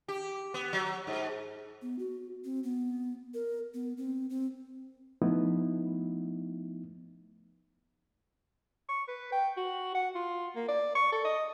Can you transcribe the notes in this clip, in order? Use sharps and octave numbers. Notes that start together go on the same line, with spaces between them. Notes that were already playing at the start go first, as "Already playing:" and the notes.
G4
B3
F#3
G#2
B3
F#4
C4
B3
A#4
B3
C4
C4
F3 A3 B3 D#4 E4
C#6
B4
G5
F#4
F#5
F4
A#3
D5
C#6
A4
D#5